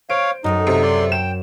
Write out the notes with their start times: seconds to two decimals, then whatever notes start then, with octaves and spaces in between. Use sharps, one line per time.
0.10 C5 C#5 F5 D7
0.44 F#2 A2 D#4 G#4 A4
0.67 C3
0.83 D5 C6
1.12 G5 E7